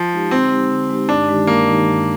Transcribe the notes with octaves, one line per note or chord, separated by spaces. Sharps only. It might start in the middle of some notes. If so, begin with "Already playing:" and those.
Already playing: F3
G#3 D#4 G4
D3 C4
G#3 D#4 G4
D3
G#3 D#4 G4
G2 D4
D#3 G#3 D#4 G4
G2 A#3
D#3 G#3 D#4 G4
G2